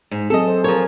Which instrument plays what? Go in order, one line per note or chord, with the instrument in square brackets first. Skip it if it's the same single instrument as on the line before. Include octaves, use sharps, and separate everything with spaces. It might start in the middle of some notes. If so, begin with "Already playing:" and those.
[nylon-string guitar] G#2
[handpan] F#3 C4 G#4 [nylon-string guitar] A4 D#5
[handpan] C5
[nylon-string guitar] F3 C#5 [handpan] G#4 A#4